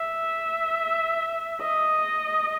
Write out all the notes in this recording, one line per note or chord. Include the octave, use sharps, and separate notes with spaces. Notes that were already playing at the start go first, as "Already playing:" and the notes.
Already playing: E5
D#5